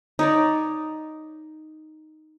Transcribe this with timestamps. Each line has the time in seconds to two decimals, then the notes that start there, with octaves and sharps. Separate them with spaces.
0.19 D#4 C#5 D5